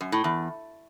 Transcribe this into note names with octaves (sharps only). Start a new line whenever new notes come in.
F#2
A2
E2